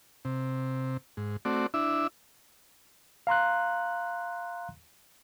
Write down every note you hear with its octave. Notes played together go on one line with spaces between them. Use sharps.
C3
G#2
A3 C4 F#4 D5
D4 E4 E5
F5 A#5 C6 F#6